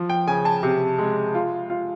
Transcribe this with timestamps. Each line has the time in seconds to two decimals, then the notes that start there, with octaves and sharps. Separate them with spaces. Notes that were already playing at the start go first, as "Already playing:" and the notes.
Already playing: F3
0.10 G5
0.27 C#3 G#5
0.45 A5
0.63 C3
0.98 G#3
1.34 F4
1.70 F4